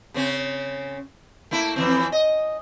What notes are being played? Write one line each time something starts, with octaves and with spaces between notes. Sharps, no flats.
C#3 C4 C#4
A3 A#3 E4
F2 E3 C4
D#5